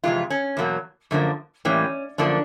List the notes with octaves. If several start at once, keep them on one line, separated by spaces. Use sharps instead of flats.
F2 C3 E3 G#3 F4
C#4
E2 B2 F#3 A#3
F#2 D3 F3 A#3
A2 E3 G3 A#3 C#4
F#2 D3 F3 A#3 D4